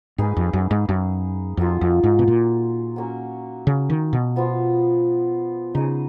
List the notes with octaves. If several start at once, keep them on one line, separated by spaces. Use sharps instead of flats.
G#2 A#3 D#4 G#4 B4
F2
F#2
G#2
F#2
F2 F#3 A#3 F4
F2
G#2
B2
A#2
F#3 A#3 C#4
C#3
D#3
B2
F3 B3 F4
C#3 D#4 G#4 D#5